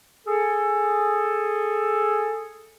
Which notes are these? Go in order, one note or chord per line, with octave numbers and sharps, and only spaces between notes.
G#4 A4